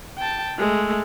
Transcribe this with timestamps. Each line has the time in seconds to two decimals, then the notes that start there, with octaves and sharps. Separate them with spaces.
0.18 G5 A5
0.58 G#3 A3